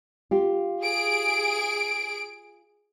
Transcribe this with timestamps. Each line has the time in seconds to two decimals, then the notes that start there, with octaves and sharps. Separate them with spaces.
0.31 F4 G4
0.82 G#4 D7